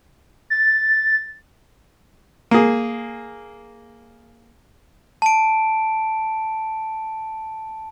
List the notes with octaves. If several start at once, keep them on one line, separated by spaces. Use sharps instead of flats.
A6
A#3 G#4
A5 D7